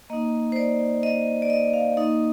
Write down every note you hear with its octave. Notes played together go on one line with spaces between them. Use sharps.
A#3 D#4 D#5
C5
D5
D#5
D5
D#5
F5
A#3 D#4 D#5